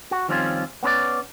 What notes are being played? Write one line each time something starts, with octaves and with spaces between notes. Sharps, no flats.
F#4
D#3 F3 G3 C4 C#4 F4
B3 C#4 B4 D5